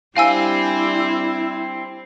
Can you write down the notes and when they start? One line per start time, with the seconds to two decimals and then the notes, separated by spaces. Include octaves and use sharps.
0.17 G3 C4 D4 E4 C5 F5 G#5 E6